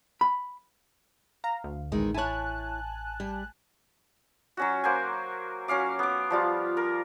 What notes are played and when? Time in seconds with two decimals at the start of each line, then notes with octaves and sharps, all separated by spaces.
0.21 B5
1.44 F5 A#5
1.64 D2
1.92 A1 E2 D#3 G#3
2.14 E4 C#5 G#5 A5 F#6
3.20 G3
4.57 F#3 C#4 F#4
4.84 A#3 C5 F#5 G#5
5.68 F#3 C#4 F5 D6
5.99 B3 D6
6.30 F3 G3 F4
6.77 A#4